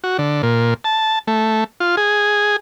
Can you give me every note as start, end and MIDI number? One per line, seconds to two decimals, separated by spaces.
0.04 0.17 66
0.18 0.42 50
0.43 0.74 46
0.84 1.19 81
1.27 1.64 57
1.80 1.96 65
1.97 2.56 68